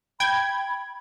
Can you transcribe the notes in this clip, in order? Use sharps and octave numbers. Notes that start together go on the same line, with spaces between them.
G5 B5 G#6